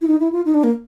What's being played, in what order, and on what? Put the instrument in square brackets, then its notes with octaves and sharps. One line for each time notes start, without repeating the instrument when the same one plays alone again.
[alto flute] E4
D#4
E4
F4
D#4
D4
A#3